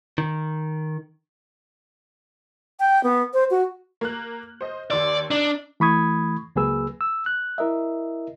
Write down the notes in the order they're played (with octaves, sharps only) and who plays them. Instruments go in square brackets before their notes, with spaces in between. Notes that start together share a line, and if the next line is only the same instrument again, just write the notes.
[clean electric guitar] D#3
[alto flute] G5
B3
C5
F#4
[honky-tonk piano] A#3 F6 F#6
C5 D#5
[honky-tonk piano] D#2 C6 E6 [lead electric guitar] D5
[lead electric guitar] D4 [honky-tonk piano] D#4 D5
[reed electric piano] E3 A3 B5 C#6 D#6 G#6
C#2 F#3 A#3 G#4 B4 E6
E6
F#6
E4 A#4 D#5 E5